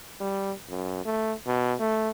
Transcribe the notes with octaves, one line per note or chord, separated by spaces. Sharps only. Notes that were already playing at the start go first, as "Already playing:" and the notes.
G3
F#2
A3
B2
A3